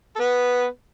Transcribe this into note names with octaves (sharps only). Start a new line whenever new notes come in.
A4
B3 B4